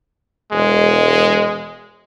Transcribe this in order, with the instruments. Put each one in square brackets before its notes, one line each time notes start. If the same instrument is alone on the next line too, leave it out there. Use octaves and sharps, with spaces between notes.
[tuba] E1 [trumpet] G#3